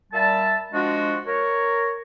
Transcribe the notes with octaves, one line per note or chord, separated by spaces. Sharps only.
A#2 G3 E5 A5
F3 G#3 D4 F#4
A#4 C#5